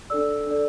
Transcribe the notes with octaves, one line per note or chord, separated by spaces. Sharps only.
D4 A4 D5 E6
D4 A4 D5